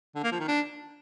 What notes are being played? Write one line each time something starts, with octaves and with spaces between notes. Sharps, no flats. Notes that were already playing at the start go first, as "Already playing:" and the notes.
D3
A#3
F3
D#3
D4